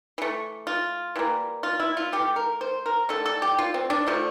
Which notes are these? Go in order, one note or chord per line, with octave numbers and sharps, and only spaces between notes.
E3 A3
F4
E3 G3 A#3
F4
E4
F4
E3 A3 G4
A#4
C5
A#4
D3 A3 A4
A4
G4
F4
C4
D4
D3 F3 A3